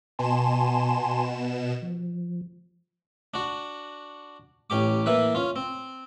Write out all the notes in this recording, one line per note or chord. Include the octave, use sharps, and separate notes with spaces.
B2 G#5 A5 C6 E7
F3
D4 F#4
A1 C#4 G4 D6
E3 A#3 E4 B4
C#4 F4
C4